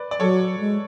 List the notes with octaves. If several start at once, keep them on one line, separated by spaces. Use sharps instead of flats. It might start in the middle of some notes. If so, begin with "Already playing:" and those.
Already playing: B4 D5
D5
F#3 A4 C#5
G#3